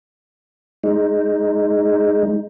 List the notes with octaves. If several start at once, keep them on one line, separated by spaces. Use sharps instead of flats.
G#3 D#4